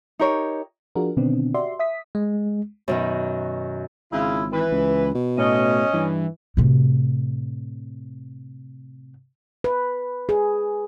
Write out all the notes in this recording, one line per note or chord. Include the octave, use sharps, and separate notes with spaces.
D#4 G4 A#4 C#5
F3 D4 F4 F#4 G#4 A#4
B2 D3 D#3 B3 C4 D4
F#4 G4 D5 E5 C6
E5 D#6 B6
G#3
F#2 B2 D#3
G#1 C#3 E4 F4
E3 B4
C#2
B2
A2 C#4 D#5
G2 E3
A2 C3
B4
G#4